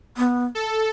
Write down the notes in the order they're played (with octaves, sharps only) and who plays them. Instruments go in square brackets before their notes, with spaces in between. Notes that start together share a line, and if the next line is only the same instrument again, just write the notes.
[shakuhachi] B3
[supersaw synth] A4